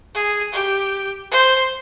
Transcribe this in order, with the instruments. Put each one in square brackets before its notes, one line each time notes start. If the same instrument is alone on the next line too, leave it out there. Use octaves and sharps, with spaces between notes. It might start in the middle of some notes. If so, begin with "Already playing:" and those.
[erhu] G#4
G4
C5